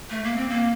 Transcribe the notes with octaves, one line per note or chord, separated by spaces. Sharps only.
A3
A#3
C4
A#3